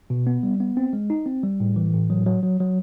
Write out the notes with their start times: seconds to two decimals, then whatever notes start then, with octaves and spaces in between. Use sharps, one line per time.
0.10 B2
0.27 B3
0.43 G3
0.60 B3
0.77 C4
0.93 G#3
1.10 D#4
1.26 C4
1.43 G3
1.60 A2
1.76 E3
1.93 A2
2.10 F#3
2.26 F#3
2.43 F#3
2.60 F#3